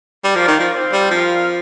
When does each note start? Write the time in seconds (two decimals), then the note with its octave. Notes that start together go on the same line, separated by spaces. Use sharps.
0.24 G3
0.34 F3 F4 A#4 D5 F5
0.48 D#3
0.60 F3
0.73 C4 F4 C5
0.93 G3
1.11 F3 C4 F4 A#4 F5